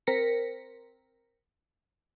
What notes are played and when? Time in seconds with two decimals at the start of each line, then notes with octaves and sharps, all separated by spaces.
0.07 C4 A#4 A#6 B6 C#7